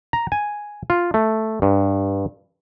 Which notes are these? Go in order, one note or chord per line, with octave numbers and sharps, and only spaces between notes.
A#5
G#5
F4
A3
G2